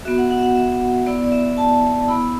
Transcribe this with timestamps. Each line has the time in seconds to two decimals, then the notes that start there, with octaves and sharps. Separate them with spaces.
0.05 B3 F#4 E5
0.18 F#5
0.30 F#5
0.38 E5
0.43 F#5
0.55 E5
1.06 B3 E4 D5
1.24 D5
1.32 E5
1.57 A5
2.08 B3 E4 B5